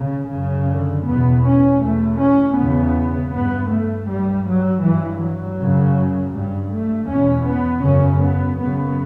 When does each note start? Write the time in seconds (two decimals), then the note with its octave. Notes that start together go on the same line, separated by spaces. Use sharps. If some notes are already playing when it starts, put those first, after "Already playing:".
Already playing: C#3
0.31 F#2 C#3
0.69 D3
1.07 E2 B2 B3
1.45 C#4
1.82 E2 B2 A3
2.20 C#4
2.57 E2 C#3 B3
3.32 G2 B3
3.70 A3
4.08 G2 G3
4.46 F#3
4.83 G2 E3
5.21 F#3
5.59 F#2 C#3
6.33 G2 G3
6.71 A3
7.08 E2 B2 C#4
7.47 B3
7.84 F#2 C#3 C#4
8.21 B3
8.59 F#2 C#3 B3